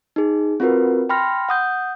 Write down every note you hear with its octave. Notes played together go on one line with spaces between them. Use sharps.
D#4 G#4
C4 F4 F#4 A#4 B4
G5 B5 C6 F6 A#6
F#5 D#6 G6